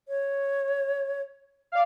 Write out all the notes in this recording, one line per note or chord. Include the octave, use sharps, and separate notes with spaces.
C#5
D5 F5